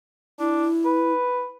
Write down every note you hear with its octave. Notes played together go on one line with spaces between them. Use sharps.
D4 E4
B4